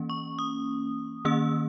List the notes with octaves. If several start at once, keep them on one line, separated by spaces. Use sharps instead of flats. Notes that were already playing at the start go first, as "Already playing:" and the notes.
Already playing: E3 A#3 C#4
C#6
D#6
D#3 A#3 C#4 E6